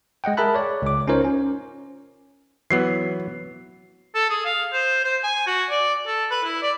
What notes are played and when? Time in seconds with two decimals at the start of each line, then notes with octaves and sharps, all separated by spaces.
0.24 G#3 D#5 F#5 G5
0.37 G#4 A#4 E5 A5 B5 F#6
0.55 C#5 D5
0.82 C#2 D6
1.08 C#4 D#4 F4 A#4 C5 C#5
1.24 C#4
2.71 E3 F#3 B3 C7
4.15 A4
4.30 G#4
4.46 F5
4.73 C5
5.04 C5
5.24 G#5
5.47 F#4
5.70 D5
6.07 A4
6.31 B4
6.44 E4
6.62 D5